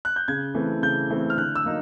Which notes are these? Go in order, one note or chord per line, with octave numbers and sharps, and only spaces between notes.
F#6
G6
C#3 G#6
E3 A3 C4
C#3 G6
E3 A3 C4
F6
D3 F#6
E6
F#3 A#3 D#4